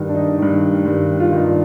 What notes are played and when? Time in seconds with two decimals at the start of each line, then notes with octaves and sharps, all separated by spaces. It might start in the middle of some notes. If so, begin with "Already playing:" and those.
Already playing: G2 D#3
0.09 D4
0.14 D#4
0.38 G2 D#3
0.85 G2 D#3
1.20 F4
1.32 G2 D#3 D#4
1.44 D4